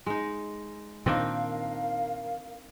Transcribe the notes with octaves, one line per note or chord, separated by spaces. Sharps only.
G#3 D#4
A#2 D#3 C4 D4 D#4 A#4 F5